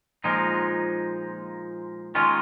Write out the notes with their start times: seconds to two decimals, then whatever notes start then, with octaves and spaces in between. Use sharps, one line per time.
0.24 A#2 F3 G#3 D#4
2.15 D#3 G#3 C#4 F4